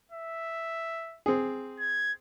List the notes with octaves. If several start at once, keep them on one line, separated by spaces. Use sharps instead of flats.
E5
C4 G#4
G#6